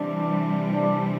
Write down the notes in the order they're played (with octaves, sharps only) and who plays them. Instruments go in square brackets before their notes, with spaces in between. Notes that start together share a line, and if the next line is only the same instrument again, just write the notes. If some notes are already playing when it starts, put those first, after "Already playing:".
Already playing: [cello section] C3 E3 G3 C4 [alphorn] D4
[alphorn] D4